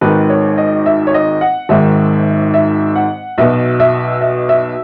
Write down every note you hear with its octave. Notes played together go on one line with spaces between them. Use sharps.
G#1 G#2 D#3 B4
C#5
D#5
E5
C#5
D#5
F#5
G#1 G#2 D#3 E5
E5
F#5
B1 B2 E5
E5
E5
E5